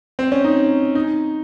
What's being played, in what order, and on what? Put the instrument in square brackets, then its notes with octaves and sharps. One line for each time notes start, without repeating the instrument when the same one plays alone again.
[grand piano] C4
C#4
D#4
D#4